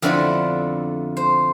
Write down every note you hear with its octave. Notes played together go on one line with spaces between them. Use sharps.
F2 D3 A3 B3 C4 E4
C5